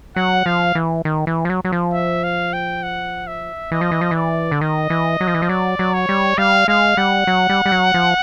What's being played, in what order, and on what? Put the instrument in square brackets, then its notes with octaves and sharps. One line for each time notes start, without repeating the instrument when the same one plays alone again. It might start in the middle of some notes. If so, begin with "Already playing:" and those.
[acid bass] F#3 [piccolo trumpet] F#5
[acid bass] F3 [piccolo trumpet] F5
[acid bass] E3
D#3
E3
F3
F#3
F#3
F3
[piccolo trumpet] E5
F5
G5
F#5
E5
[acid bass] E3 [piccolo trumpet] D#5
[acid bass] F3
E3
F3
[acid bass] E3 [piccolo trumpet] D5
[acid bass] D3
[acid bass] D#3 [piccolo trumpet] D#5
[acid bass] E3
F#3
F3
E3
F3
[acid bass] F#3 [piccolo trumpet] D5
[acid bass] F#3
[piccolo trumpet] C#5
[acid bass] G3
[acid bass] G3 [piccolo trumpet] F5
[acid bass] G#3 [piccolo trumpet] F5
[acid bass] G3 [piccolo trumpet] F#5
[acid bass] F#3
G3
G3
F#3
F3